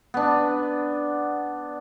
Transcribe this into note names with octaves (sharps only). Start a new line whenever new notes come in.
B3 D4